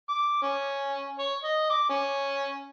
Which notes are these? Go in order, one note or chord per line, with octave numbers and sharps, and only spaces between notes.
D6
C#4
C#5
D#5
D6
C#4